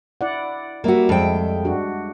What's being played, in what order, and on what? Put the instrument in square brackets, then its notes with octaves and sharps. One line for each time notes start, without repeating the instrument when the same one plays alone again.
[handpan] E4 D5 F#5
[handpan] G3 E5 [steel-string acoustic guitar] A#3 F#4
[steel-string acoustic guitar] F2 G5 [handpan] G#3
[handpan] D4 F#4